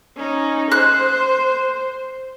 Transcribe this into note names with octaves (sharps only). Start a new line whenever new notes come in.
C#4 D#4
C5 F#6